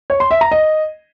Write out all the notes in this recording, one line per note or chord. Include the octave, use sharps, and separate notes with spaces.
C#5
C6
E5
A#5
D#5